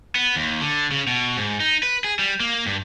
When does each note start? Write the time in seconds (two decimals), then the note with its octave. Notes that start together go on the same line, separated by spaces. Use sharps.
0.15 B3
0.36 D#2
0.61 D3
0.92 C#3
1.07 B2
1.37 G#2
1.60 D#4
1.83 B4
2.04 G#4
2.19 G3
2.40 A#3
2.66 G2